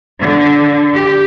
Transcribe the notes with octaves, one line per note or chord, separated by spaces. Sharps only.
D3
G4